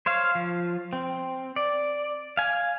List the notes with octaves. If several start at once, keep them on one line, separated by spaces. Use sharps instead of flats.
C5 C#5 F5
F3
C4
D5
F5 G#5